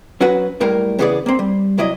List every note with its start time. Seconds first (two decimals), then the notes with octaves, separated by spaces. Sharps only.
0.21 F#3 C#4 F#4 B4 F#5
0.61 B1 A2 G3 A#3 A#4
0.99 C#3 E3 B3 F4 G#4 D5
1.26 A#3 C4
1.39 G3
1.78 B1 C3 F#3 E4 D5 D#5